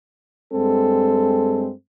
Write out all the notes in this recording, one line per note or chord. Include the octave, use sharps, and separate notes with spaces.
G2 G#3 C4 A4